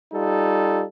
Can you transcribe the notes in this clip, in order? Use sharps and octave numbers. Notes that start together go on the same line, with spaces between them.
G3 D#4 F4 A4